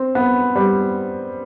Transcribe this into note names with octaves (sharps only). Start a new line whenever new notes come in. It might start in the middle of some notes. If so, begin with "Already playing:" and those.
Already playing: C4
B3
G3